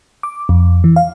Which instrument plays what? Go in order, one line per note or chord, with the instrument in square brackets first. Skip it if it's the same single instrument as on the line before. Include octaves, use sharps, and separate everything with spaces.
[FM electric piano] D6
F2
E3
F5